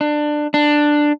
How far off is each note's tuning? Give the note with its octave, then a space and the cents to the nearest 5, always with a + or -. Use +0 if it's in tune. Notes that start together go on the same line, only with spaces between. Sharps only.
D4 +20
D4 +10